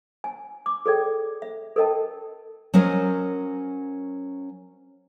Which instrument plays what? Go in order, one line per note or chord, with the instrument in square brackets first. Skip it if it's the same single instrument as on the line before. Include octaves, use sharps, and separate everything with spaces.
[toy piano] G#5
D6
G#4 A4 D5 G5
E5
A4 A#4 D#5 G5 A5
[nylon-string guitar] F#3 C#4 A#4 C5 D#5